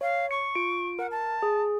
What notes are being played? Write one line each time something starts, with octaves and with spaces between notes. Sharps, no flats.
C#5 F5
C#6 C#7
F4 D7
A#4 F#5
A5
G#4